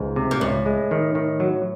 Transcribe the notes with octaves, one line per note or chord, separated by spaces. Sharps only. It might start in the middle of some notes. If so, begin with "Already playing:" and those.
Already playing: C#2 G#2
C3
A#2
C#2 A2
G#3
D#3
D#3
F#3